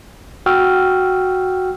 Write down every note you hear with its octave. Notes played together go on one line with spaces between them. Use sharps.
F#4 G5 E6 F6